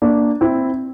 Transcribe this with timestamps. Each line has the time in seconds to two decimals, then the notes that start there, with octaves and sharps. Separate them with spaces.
0.02 A#3 D4
0.41 C4 E4